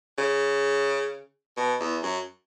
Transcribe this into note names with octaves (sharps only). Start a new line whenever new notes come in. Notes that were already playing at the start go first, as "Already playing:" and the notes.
C#3
B2
E2
F#2